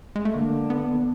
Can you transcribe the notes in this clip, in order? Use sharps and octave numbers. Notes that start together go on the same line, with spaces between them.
G#3
A3
D3 A#3
B3